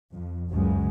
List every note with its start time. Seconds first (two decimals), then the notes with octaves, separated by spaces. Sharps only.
0.13 F2
0.50 F#1 C#2 F#2 C#3 G#3